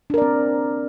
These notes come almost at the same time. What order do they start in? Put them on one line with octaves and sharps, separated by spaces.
D4 A#4 D5 C4